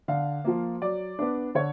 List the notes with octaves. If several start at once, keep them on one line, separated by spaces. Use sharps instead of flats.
D3 F5
F3 A#3
F#3 D5
B3 D4
D3 C#5